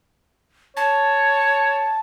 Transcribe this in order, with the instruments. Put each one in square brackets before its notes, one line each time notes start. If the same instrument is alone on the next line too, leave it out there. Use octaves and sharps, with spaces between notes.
[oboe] C#5 [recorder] A5